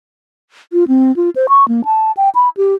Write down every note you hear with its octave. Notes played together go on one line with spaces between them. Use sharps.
F4
C4
F4
C5
C#6
A#3
A5
G5
B5
G4